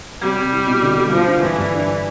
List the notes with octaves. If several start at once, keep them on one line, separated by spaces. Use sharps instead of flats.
C3 G3
C3
E4
B2
D3
D3
F3 F4
D3
G2 E3
G2
D4